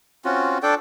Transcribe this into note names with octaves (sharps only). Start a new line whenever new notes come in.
C4 C#4 F4 F#4
D4 A4 D5 G5